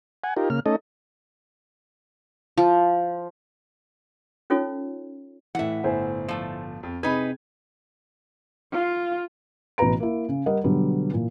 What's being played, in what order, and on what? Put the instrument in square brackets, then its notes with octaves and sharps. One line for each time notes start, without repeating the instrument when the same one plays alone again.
[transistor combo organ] F#5 G#5
D#4 F4 G4 A#4
C#3 A#3 F6
A3 C#4 D#4 A4 D#5
[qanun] F3
[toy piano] C#4 D#4 F4 A4 C#5
[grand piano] A2 E3 [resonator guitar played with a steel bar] E5 F#5
[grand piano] G1 A2 [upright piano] E4 C5 G#5
[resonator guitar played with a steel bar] F3 A3
[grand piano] F2
[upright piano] C3 B5 G#6 [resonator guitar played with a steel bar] D#4 B4 [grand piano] G#4
[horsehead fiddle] F4
[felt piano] A1 B2 F#4 B4 A#5 D7
A#3 E4
C#3
G3 A#4 D#5 F#5
B2 D3 F#3 G3 B3
A#2 E3